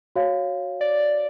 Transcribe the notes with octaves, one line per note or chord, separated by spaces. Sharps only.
F#4 C#5 F5
D5